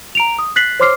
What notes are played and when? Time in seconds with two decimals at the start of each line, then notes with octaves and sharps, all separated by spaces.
0.15 A#5 D7 F7
0.39 D#6
0.56 F#6 A6 B6 C7 F#7
0.80 C5 C#5 C6 D6 F6 C7